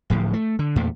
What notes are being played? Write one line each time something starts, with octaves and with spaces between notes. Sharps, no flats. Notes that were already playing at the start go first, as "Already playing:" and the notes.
D1 A2 F3
A3
D3
E2 A#2 A3